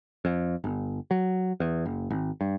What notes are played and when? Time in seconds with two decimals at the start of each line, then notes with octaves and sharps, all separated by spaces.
0.25 F2
0.64 G1
1.11 F#3
1.60 E2
1.85 F#1
2.10 G#1
2.41 G2